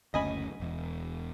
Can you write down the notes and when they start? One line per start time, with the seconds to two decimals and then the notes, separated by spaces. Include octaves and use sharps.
0.14 F#1 D2 C#4 D#5 G#5 B5
0.60 E1 E2